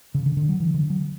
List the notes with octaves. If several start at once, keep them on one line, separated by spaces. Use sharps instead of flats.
C#3
D3
D3
F#3
E3
D3
F#3